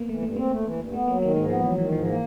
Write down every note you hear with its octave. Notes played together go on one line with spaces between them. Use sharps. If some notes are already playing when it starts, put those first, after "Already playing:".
Already playing: A#3 B3
E3 A3
G2 A3
A#3 C4
A3
E3
G2
A3 B3
F#3 A#3
D#3 A#3
G#2 G#3
F3 B3
E3 F#3
D#3 E3
G#2 F3
E3 A#3